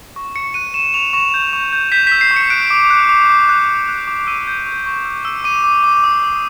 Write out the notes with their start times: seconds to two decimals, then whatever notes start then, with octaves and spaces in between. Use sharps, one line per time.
0.16 C#6
0.35 C#6 C#7
0.54 F#6 D#7
0.74 C#6 E7
0.94 C#6 F7
1.13 C#6 E7
1.34 G6
1.53 C#6
1.73 G6
1.92 G6 B6
2.07 E6 B6
2.21 C7
2.31 C#6
2.36 C#7
2.50 F#6 D7
2.70 D6
2.90 F#6
3.09 D6
3.30 D6
3.49 F#6
3.68 F#6
3.89 F#6
4.07 D6
4.27 E6 D#7
4.47 G6
4.66 C#6
4.86 C#6
5.05 E6
5.25 E6
5.44 D6 D#7
5.64 D6
5.84 D6
6.04 D#6
6.23 D#6